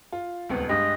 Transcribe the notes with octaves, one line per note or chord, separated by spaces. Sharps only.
F4
D#1 C#2 B3
G2 G#3 G4 D#5